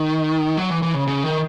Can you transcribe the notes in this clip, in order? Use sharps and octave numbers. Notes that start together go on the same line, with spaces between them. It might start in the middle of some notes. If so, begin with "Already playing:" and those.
Already playing: D#3
F#3
E3
E3
C#3
C#3
D#3